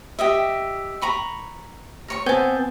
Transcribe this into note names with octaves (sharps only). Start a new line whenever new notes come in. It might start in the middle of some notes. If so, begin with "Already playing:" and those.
G4 D#5 E5
A#5 B5 C#6
A#4 C#5 C#6
B3 C4 G#5 A5 G6